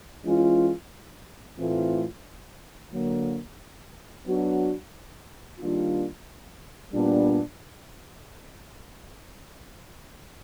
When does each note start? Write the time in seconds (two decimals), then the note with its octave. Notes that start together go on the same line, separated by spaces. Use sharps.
0.25 E3 G#3 C#4 F4
1.58 A2 E3 A3 C4 F4
2.92 D3 F#3 A#3
4.26 F#3 B3 D4 F#4
5.59 D#3 G3 A#3 D4 F4
6.93 A#2 G3 B3 D4